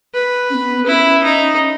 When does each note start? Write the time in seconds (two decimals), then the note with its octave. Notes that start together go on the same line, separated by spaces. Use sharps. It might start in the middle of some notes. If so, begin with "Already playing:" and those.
0.14 B4
0.50 C#4
0.55 B3
0.87 C#4 E4
1.24 D#4